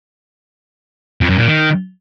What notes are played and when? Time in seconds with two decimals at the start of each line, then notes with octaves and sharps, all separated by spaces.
1.21 F2
1.30 F#2
1.38 A#2
1.47 D#3